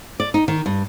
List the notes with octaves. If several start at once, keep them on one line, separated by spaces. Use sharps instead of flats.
D5
D#4
D#3
G2